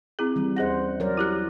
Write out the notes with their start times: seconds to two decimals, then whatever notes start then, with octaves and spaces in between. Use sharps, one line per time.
0.19 C4 E4 G#4
0.36 E3 G3
0.56 D#2 G#4 C5 F#5 A#6
1.00 F#3 A#4 C#5 D5
1.17 E4 G4 F#6